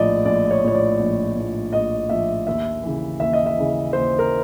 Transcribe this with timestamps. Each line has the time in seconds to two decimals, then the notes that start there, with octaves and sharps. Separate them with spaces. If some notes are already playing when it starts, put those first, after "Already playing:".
Already playing: A#1 A2 F3 D5 D#5
0.25 A#1 D5
0.51 C#5
0.63 A2 F3 C#5
0.75 D5
0.99 A#1
1.36 A2 F3
1.73 A#1 D#5
2.09 A2 F3 E5
2.47 D#2 E5
2.83 C#3 E3
3.20 D#2 E5
3.33 D#5
3.46 E5
3.56 C#3 E3
3.93 D#2 C5
4.19 A#4